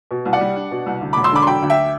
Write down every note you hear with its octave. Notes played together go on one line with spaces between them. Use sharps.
B2
C2
D5 F#5
G3
D4
B2
C2
D2
E1 B5 D6
C6 E6
D3 B5 D6
C6
F#3 G5 B5
D2
E5 G5